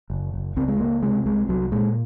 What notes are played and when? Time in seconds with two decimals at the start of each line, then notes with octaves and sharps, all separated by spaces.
0.10 F#1
0.34 F#1
0.56 C#2 C4
0.68 G#3
0.80 C#2 A#3
1.02 C3 G#3
1.25 C2 G#3
1.48 C2 F#3
1.72 A#2 G#3